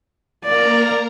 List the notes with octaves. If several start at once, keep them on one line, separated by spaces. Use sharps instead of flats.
A#3 A#4 D5 A#5